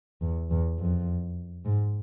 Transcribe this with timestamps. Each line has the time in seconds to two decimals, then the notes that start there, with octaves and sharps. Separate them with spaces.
0.22 E2
0.51 E2
0.79 F2
1.66 G#2